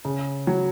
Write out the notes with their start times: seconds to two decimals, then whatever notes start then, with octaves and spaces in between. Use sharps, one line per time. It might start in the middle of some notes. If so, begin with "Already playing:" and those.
0.05 C#3
0.47 F#3